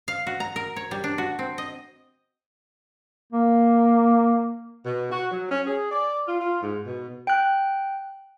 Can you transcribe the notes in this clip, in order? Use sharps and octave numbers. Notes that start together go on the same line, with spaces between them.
F5
F#4
A#5
A#4
C#5
G3
D4
F#4
C4
D#5
A#3
B2
F#4
F#3
C#4
G#4
D5
F4
F4
G#2
B2
G5 F#6